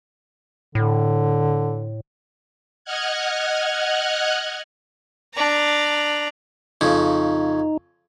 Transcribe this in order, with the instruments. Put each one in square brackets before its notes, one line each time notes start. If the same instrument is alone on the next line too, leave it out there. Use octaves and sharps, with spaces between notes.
[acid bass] A2 [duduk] D3
[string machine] D#5 F#5 F6 F#6 G#6
[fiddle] D4 A#5
[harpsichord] F2 C#3 [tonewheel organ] D#4